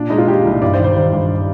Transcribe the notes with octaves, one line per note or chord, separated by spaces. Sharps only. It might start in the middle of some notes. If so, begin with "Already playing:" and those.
Already playing: A#2 D4
G#3 D#4
F4
A#2 G4
C2
G2 D5
C5
D#3
C5
D#3 C5
G2